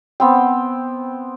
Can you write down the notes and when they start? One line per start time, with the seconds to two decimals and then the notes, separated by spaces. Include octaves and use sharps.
0.20 B3 C4 G5